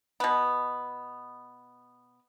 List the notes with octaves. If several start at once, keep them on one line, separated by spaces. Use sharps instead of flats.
B2 B3